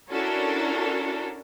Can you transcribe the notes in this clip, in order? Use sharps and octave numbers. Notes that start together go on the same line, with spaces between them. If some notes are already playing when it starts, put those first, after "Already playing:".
C#4 D4 E4 F#4 A4 A#4